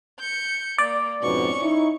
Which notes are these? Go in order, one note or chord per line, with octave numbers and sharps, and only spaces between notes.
G6 C#7
A#3 D5
F2 G#2 B2 C#4 C#6
D#4 E4